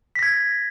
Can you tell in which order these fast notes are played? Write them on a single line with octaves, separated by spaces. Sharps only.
B6 A#6 G#6